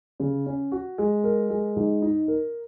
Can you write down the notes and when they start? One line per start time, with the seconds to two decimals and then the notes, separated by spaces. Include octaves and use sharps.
0.20 C#3
0.46 C#4
0.72 F#4
0.98 G#3
1.24 A#4
1.50 G#3
1.76 G#2
2.02 D#4
2.28 A#4